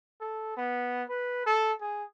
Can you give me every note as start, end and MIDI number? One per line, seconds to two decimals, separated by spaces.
0.21 0.55 69
0.57 1.03 59
1.09 1.43 71
1.46 1.72 69
1.81 2.04 68